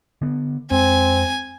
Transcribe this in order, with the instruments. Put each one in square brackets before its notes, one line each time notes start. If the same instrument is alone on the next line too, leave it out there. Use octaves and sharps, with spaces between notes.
[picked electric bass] D3 B3
[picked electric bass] F2 G#3 [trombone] C4 [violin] G#5